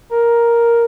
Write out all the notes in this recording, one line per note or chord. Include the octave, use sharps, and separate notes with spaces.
A#4